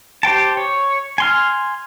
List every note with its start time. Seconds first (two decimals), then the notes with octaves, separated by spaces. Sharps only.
0.23 G4 C5 G5 A5
0.57 C#5
1.18 G#5 C6 F6